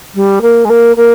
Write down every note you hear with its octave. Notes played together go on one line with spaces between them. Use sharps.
G3
A#3
G#3
A#3
A#3